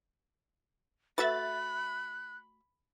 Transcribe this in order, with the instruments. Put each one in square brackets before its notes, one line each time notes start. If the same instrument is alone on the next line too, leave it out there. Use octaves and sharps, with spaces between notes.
[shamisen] A3 F#4 B4 [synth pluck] E5 A6 [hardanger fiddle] B5 [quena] F#6